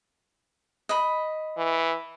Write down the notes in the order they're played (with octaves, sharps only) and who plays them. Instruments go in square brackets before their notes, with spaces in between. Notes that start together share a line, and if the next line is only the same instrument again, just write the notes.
[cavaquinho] D#5 B5
[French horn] E3